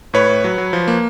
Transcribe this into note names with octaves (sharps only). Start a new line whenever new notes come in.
A2 B4 C#5
A2
F#3
F#3
F3
A#3